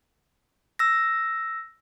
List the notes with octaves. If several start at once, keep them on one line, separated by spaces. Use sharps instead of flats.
E6 A#6